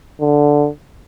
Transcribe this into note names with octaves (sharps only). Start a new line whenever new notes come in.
D3